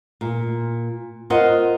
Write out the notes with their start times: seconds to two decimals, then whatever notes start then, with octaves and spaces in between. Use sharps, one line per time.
0.21 A#2
1.30 F4 A#4 C5 D#5 F#5